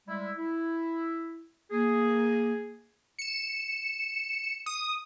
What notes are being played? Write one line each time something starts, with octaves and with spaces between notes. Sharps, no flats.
G3 G#3 E4
E4
A#3 G#4
C#7 E7
D#6